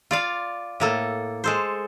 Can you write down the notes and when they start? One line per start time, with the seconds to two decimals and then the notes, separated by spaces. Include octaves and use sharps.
0.11 F4 D5 F5
0.80 A2 A#3 A4
1.44 G#3 A4 C5